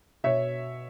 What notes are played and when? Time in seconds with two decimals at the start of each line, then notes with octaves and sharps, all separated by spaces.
0.24 B2 C#5 E5